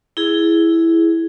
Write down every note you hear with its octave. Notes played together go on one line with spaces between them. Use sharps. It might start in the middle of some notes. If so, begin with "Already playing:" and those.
E4 G#4